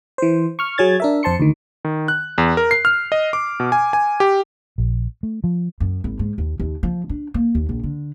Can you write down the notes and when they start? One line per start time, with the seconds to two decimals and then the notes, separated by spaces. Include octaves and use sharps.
0.18 E3 C5
0.59 C#6 F6
0.78 F#3 G#4 C#5 G#6 A6
1.00 D4 A#4 E5
1.23 F2 C5 A5 C6 C#7
1.40 D2 D#3
1.85 D#3
2.08 F#6
2.38 E2
2.57 A#4
2.71 C7
2.85 F6
3.12 D#5
3.33 D6
3.60 B2
3.72 G#5
3.93 G#5
4.20 G4
4.78 A#1
5.23 A3
5.44 F3
5.80 F#2
6.04 G#1
6.19 G#2
6.38 D#2
6.60 D#2
6.83 F3
7.09 D4
7.34 A#3
7.55 D#2
7.69 A#1
7.84 D3